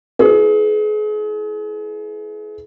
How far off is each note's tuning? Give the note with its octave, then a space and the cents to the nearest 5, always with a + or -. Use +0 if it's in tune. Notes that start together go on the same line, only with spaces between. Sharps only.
E4 +0 G#4 +35 B4 +25